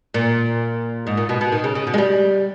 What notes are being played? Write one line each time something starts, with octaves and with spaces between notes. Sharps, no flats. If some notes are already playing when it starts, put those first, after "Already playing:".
A#2
G#2
A#2
B2
B2
D#3
C#3
C#3
B2
G#3
G3